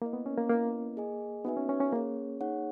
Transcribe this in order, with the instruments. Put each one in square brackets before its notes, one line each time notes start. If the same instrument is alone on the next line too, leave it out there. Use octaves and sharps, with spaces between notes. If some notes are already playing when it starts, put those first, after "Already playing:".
[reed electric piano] A#3 [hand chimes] E4 A#4 D#5
[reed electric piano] B3
C#4
A#3
[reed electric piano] A#3 [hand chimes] E4 B4 D#5
[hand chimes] G#4 D#5 G#5
[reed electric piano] B3 [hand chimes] D#4 F#4 B4 E5 G#5
[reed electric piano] C#4
C#4
C#4
[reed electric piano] A#3 [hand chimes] C#4 G#4 C#5
[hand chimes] D#4 G#4 C#5 F#5